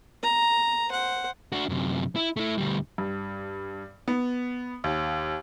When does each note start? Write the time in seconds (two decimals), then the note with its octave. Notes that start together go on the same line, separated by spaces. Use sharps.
0.23 A#5
0.89 C5 F#5
1.52 D4 F#4
1.69 F#2 C3
2.16 E4
2.37 A3 E4
2.58 D2 G3
2.98 G2
4.08 B3
4.84 D#2